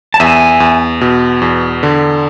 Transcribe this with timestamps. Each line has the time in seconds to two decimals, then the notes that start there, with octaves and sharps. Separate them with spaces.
0.14 A5
0.20 E2 E5 G#5
0.60 E2
1.01 B2
1.42 E2
1.83 D3